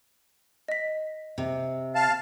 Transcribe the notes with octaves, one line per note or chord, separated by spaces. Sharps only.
D#5 B6
C3
F5 A5